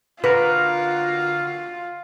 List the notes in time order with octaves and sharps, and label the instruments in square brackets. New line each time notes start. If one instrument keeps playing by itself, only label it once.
[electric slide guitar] D3 F#4 A#4 [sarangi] F4 [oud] B4